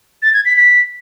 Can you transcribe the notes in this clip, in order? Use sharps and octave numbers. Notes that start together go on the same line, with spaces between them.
A6
G#6
B6
B6